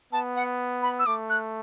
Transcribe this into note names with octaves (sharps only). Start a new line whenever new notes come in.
B3 A5
F#5
B5
E6
A3 D6
F#6